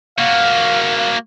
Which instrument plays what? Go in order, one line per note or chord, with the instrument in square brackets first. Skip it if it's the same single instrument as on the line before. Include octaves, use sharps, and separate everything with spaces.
[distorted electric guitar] A#3 F#4 [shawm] F5